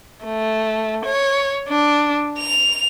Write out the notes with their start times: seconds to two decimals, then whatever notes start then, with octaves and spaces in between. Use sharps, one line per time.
0.24 A3
1.06 C#5
1.68 D4
2.39 F7